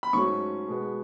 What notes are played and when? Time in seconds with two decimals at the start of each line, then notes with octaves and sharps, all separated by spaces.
0.03 B5
0.13 G#2 F#3 A3 C#4 C#6
0.68 B2 G#3 B3